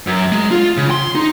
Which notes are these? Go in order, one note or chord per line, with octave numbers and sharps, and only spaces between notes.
F#2
G#3
F4
C#3
C6
D#4